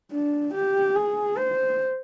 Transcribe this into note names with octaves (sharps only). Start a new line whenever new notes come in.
D4
G4
G#4
C5